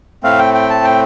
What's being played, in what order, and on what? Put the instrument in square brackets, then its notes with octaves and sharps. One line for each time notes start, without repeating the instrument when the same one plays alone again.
[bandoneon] A2 A3 C4 F5
G5
G5
A5
G5